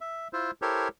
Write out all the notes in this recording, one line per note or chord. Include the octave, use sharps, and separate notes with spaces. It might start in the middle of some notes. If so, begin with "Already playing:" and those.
E5
E4 F4 C5
E4 G4 A4 A#4 C5 C#5